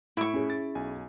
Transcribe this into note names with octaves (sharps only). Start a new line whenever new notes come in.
A2 E4 C#6 D7
C#4 G#4
A6
B1 G#5